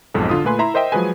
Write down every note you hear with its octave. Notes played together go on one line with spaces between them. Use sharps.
B1 F2 G#2 A4
D3 F4 D#6
A#2 A3 B4 G#5 C6
E4 E5 A#5 C6
A#4 C5 D#5 E5 G5
F3 F#3 G#3 G#4 B4 G#5